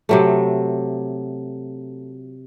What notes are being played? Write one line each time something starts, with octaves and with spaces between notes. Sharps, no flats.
C3 F#3 A3